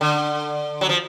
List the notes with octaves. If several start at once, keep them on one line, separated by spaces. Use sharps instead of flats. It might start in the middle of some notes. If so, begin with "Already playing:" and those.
D3
F#3
F3